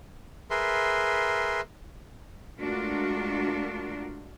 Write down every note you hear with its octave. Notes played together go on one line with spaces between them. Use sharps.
G#4 A#4 B4 E5 C6
G#3 A3 D4 F4 F#4 A#4